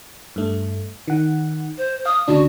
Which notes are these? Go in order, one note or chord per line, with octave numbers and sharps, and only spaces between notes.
G2 A3
D#3 F#5
C5
F5 D#6
D2 C#3 D4 F#4